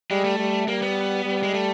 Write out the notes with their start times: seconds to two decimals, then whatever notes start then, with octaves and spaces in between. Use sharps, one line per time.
0.11 G3 G#3
0.24 A3
0.39 G3
0.68 G3 A#3
0.82 B3
1.25 G3
1.43 G#3
1.54 A3